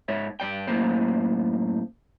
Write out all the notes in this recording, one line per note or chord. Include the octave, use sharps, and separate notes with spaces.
G#2 C#5 E5
G2 D5 G5
F#2 A2 A#3 C5